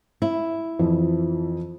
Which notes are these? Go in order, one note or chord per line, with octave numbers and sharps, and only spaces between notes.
E4
F2 E3 F3